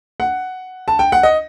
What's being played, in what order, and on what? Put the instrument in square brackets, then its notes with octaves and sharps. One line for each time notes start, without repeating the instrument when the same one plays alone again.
[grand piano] F#5
A5
G5
F#5
D#5